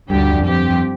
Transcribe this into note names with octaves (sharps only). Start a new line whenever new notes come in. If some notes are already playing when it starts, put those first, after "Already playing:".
D2 G2 D3 G3 D4 G4
G2
F2
G2 F3 C4 G4
F2